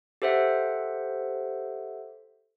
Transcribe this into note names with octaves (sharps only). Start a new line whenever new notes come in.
G4 A4 C5 E5 F#5